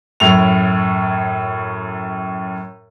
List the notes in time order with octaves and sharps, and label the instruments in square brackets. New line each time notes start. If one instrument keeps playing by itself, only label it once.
[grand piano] F#2 A2 F7